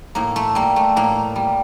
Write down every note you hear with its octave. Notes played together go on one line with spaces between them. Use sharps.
A2 A#3
A3
G3 A#3
A3
A2 A#3
G3